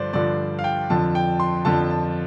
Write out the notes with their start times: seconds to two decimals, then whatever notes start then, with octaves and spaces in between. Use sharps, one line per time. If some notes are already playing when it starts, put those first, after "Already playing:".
Already playing: G2 D3 F3 C5 D5
0.13 G2 D3 F3 D5
0.59 F5
0.64 G5
0.90 F2 D3 F3 A5
1.15 G5
1.40 C6
1.65 F2 D3 F3 A5
1.90 A5